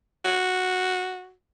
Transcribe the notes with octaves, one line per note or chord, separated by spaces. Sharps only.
F#4